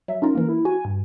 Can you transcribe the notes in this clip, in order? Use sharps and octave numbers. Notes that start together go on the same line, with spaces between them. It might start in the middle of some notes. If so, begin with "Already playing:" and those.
F#3 E5
C#4 D#4 F4 A#4
E3 A#3
E4
F#4 G#5
G2